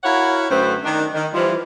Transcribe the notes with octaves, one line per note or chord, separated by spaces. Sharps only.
E4 F#4 A#4 C#5 F5 F#5
F#2 D3 A3 C4 B4 C5
D#3 D4
D#3
E3 F3 G3